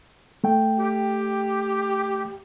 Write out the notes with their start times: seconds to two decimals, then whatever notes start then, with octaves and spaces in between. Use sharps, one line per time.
0.44 A3 G5
0.79 G4